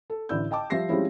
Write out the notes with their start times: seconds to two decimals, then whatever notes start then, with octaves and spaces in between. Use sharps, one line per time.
0.10 A4
0.29 A1 D3 E4 D5 E6 G6
0.51 D#5 G5 A5 D6
0.70 F3 G3 E5 A#6 C7
0.89 F3 G3 G#3 C4 C#4 E4